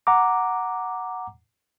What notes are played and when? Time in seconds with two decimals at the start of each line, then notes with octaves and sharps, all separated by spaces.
0.07 F#5 A#5 D6